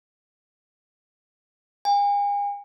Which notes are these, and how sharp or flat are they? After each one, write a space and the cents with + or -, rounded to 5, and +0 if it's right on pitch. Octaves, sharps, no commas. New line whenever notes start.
G#5 -40